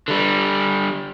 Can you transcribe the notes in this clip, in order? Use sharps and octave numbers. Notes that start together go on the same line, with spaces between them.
D3 G3